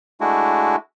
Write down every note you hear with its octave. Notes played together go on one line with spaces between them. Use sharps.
G#3 A3 D4 E4 F#4